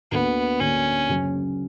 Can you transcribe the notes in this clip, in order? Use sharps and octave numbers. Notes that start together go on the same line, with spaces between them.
D2 D3 A#3 B3
D2 D3 A#3 C#4
F#1 F#2 C#3